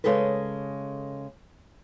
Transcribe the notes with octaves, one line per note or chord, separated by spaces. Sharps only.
C#3 G#3 G#4 A4 B4